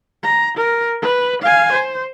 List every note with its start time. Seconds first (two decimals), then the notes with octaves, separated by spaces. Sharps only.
0.23 A#5
0.57 A#4
1.02 B4
1.42 F5 G#5
1.72 C5